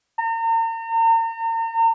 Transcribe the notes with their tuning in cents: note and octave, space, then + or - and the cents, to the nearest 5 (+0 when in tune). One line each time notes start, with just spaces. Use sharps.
A#5 -40